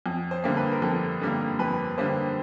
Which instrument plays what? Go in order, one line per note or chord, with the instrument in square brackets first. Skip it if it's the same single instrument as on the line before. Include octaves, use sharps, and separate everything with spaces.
[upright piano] F2
C5
D3 G3 A#3
B4
A#4
F2 A4
D3 G3 A#3
F2 B4
D3 G3 A#3 C5